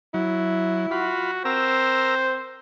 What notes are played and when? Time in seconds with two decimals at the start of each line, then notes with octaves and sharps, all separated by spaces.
0.14 F#3 E4
0.91 F4 F#4 B5
1.45 C4 A#4 C5 A#5 E6